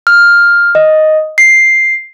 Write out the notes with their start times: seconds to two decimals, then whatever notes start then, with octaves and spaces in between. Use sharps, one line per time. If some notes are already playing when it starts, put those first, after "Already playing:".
0.07 F6
0.75 D#5
1.38 C7